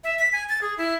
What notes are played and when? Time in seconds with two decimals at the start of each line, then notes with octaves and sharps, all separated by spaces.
0.04 E5
0.19 B6
0.33 G#5
0.49 A6
0.62 G#4
0.78 E4